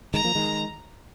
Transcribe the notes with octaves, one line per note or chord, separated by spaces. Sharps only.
D#3 G#3 A#5
F3 A#3
D#3 G#3